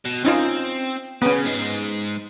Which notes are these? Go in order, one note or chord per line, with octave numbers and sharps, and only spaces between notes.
B2
C4 C#4 D#4 F4
C#3 B3 C#4
G#2 G#3